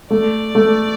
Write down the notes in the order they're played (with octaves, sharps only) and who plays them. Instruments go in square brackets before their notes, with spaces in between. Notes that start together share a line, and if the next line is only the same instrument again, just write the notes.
[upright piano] A3 [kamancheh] D5
[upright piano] A3